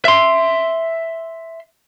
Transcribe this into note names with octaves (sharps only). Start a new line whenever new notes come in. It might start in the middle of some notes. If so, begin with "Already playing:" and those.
E5 C6